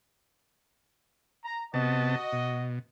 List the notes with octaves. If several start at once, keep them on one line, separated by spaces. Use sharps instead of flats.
A#5
C3 B3 F#4 D#5 A5
B2